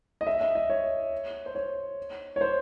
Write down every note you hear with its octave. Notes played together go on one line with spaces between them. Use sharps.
D#5
E5
E5
D#5
C#5
C5
C#5
C#5
C5